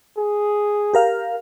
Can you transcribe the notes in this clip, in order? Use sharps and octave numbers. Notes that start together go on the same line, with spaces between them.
G#4
G4 A#4 F5